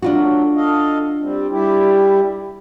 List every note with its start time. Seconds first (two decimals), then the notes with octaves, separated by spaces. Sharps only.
0.02 F#3 A3 D4 F4 F#4
0.56 A4 D#5 F5
1.21 G3 C4
1.50 G3 E4 G4